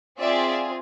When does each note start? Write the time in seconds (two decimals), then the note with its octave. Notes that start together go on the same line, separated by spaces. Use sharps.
0.19 C4 F4 G#4 D5 E5